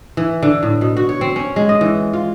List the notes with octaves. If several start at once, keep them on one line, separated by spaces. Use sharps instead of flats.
E3
D3
A2
B2
F#4
C#5
C4
C#4
G#3
D#5
E3
F4